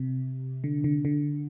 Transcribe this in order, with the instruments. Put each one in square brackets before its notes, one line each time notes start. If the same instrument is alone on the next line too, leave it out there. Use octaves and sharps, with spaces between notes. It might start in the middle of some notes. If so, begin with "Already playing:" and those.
Already playing: [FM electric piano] C3
D3
D3
D3